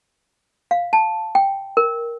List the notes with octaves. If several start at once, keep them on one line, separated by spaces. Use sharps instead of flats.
F5
A5
G5
A#4